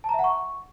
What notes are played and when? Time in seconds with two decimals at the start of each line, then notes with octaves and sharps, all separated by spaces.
0.04 A5
0.09 A#5
0.14 E5
0.19 F#5
0.24 C#6